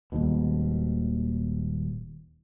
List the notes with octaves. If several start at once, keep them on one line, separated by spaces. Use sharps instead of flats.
D#1 D#2 G#2 B2